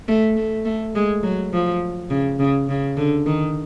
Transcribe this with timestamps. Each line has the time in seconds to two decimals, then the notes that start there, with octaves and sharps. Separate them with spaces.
0.08 A3
0.36 A3
0.65 A3
0.95 G#3
1.23 F#3
1.53 F3
2.10 C#3
2.39 C#3
2.68 C#3
2.97 D3
3.26 D#3